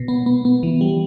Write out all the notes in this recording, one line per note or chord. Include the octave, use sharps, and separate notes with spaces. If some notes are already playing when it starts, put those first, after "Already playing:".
Already playing: B2
B3
B3
B3
E3
G3